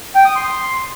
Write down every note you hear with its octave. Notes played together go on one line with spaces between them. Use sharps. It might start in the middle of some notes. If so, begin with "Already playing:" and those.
G5
D#6
C6